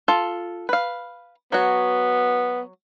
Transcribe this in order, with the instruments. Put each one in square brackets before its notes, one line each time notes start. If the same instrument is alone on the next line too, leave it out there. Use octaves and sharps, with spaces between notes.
[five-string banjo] F4 A4
B4 F5
[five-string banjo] F#3 F#4 [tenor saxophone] B3